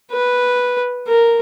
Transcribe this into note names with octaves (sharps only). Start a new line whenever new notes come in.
B4
A#4